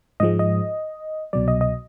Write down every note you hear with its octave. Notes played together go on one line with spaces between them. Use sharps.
G#2 F3 G#3 D#5
D#5
C2 B2 F#3 D5
D#5
D#5